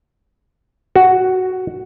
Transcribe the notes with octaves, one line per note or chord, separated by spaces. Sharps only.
F#4